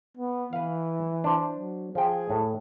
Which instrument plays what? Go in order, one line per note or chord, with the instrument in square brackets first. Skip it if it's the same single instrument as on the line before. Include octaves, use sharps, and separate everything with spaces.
[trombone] B3
[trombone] E3 [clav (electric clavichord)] B4 F5
[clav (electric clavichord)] D4 C5
[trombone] F#3
[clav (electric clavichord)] F3 G5 [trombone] G#4
[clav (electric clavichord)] A2